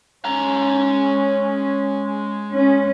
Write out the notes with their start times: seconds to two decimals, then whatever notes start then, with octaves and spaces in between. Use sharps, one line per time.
0.25 G#3 C#4 A#5
2.53 C#4